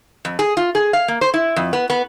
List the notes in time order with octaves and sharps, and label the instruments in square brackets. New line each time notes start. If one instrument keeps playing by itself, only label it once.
[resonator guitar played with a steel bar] F2
G#4
F4
G#4
F5
A#3
C5
E4
F2
B3
B3